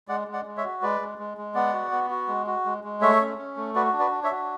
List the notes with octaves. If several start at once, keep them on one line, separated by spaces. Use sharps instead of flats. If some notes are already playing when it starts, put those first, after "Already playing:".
G#3 D5 F#5
G#3
D5 F#5
G#3
C#5 E5
F#4
G#3 B4 D5
G#3
G#3
G#3
B3 D5 F#5
F#4
B3
F#4
G#3
F#4
G#3
G#3
A3 C#5 E5
C#4
C#4
A3
F#4 B4 D5
D4
B4 D5
D4
C#5 E5
F#4